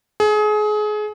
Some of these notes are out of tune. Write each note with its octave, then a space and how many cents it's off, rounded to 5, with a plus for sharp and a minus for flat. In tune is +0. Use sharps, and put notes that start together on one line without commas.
G#4 +30